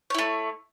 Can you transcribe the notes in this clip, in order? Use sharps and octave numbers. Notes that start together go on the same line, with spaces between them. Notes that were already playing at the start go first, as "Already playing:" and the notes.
A3 E4 C#5